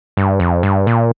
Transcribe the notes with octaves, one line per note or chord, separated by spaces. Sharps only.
G2
F2
G2
A#2